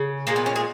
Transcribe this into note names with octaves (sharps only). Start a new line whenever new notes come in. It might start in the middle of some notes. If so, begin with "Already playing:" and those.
Already playing: C#3
A#2 F3 G#3 A#3
B3
C#4
G#4